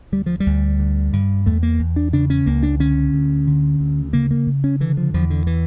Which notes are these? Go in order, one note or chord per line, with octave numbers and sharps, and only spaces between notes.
D2 G3
F3
G3
D2
D3
G2
E2 A3
A#3
E2
D4
C#3 D4
C#4
C#2 A#3
D4
D3 C#4
D2
D3
D2
C#3 A#3
A#3
C#3
C#4
D3 E3
F3
E2 F3
D3
E3